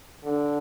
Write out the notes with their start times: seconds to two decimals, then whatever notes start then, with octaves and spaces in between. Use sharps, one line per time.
0.24 D3